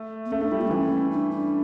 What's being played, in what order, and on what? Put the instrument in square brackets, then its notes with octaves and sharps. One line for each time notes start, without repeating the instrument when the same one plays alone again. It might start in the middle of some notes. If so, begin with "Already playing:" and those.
Already playing: [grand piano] A3
[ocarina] A#3
[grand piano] A3 [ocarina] C#4
[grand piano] A3 [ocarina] D4
[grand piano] G3 [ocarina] F4
[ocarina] A#3
D4
[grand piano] E3 [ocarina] C#4
[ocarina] D4
D4